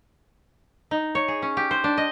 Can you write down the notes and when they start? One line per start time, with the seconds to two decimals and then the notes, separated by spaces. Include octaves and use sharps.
0.91 D#4
1.15 C#5
1.28 G#4
1.42 C#4
1.57 G4
1.71 C5
1.84 D4
1.98 D#5